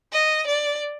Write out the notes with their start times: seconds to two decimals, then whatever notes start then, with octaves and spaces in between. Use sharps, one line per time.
0.13 D#5
0.47 D5